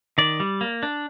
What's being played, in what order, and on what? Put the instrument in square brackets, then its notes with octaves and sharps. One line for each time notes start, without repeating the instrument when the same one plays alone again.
[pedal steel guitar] D#3 D5
G3
A#3
D4